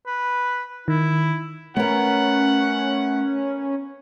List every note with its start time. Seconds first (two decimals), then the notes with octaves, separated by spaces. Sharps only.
0.06 B4
0.88 D#3 E4
1.77 A3 B3 C#4 A#4 F#5